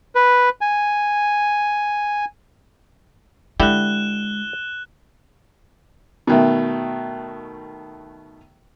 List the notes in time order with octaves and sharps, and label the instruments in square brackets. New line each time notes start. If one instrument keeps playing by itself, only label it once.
[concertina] B4
G#5
[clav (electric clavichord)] D3 E4 G4 [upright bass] G#3 [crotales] F#6 E7 G7
[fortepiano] B2 D#3 A3